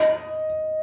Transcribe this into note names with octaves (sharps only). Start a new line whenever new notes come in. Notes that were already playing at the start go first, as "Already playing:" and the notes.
Already playing: D#5